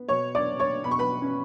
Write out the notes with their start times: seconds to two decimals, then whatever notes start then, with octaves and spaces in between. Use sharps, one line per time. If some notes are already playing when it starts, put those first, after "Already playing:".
Already playing: B3
0.08 B2 C#5 C#6
0.35 D5 D6
0.46 D4
0.59 C#5 C#6
0.84 B2 B5
0.91 C#6
0.99 B4 B5
1.22 C#4